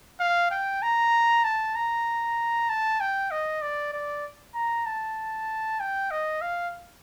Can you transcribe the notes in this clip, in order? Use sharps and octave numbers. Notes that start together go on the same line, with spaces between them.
F5
G5
A#5
A5
A#5
A5
G5
D#5
D5
D5
A#5
A5
G5
D#5
F5